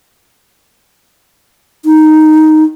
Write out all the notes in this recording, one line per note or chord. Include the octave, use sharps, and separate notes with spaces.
D#4